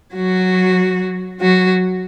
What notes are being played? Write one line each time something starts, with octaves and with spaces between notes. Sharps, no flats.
F#3 F#4
F#3 F#4